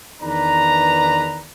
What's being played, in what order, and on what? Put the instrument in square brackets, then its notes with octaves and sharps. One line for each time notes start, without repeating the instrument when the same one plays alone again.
[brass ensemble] E2 D#3 D4 B4 A#5